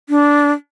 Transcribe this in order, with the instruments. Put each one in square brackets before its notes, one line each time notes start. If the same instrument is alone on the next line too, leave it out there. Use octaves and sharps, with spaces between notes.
[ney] D4